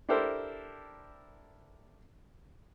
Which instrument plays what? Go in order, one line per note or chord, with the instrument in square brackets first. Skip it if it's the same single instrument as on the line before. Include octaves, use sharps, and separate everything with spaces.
[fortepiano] D4 E4 G4 A4 A#4 C5